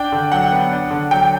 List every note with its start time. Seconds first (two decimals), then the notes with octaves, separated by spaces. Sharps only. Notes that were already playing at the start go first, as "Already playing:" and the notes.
Already playing: D4 G5
0.12 D3
0.32 F#3 F#5
0.52 B3
0.72 D4
0.91 D3
1.11 F#3 G5